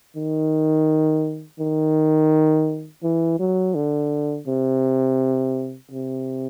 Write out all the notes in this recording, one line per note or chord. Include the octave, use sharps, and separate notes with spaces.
D#3
D#3
E3
F#3
D3
C3
C3